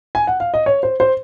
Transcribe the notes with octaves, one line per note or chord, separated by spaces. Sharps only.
G#5
F#5
F5
D#5
C#5
C5
C5